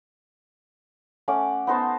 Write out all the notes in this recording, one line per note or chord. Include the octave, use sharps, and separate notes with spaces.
A3 C#4 F#5 D6
B3 D#4 C5 A5